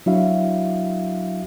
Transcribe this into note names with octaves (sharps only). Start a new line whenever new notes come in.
F#3 D4 E4 F#4 E5 F5